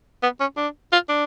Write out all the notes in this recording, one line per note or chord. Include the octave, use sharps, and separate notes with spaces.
B3
C#4
D4
F4
D4